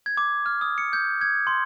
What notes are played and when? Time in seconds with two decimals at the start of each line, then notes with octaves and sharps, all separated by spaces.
0.06 G#6
0.17 D6
0.46 F6
0.61 D#6
0.78 C#7
0.93 G6
1.21 G#6
1.47 C6